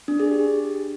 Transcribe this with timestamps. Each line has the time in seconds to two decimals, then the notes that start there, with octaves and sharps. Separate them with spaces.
0.08 D4
0.20 G#4
0.31 G4